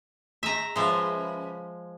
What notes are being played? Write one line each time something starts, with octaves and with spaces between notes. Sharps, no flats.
G#3 E5 A#5
C#3 F3 G#3 B4 E5